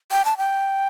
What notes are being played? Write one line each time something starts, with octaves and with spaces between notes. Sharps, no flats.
G5
A5
G5